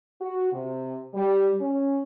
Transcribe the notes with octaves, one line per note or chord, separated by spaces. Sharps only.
F#4
C3
G3
C#4